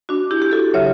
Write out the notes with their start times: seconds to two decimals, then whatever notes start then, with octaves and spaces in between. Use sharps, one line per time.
0.09 D4 F#4
0.31 E4 G4
0.42 G4
0.52 F#4 A4
0.74 C#3 F#3 C#5 E5